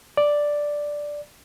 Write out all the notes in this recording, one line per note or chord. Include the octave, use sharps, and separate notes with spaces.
D5